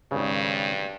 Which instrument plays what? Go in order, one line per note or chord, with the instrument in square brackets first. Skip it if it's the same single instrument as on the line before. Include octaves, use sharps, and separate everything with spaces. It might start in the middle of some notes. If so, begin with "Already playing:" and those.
[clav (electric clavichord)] G#1 C#3 [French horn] G2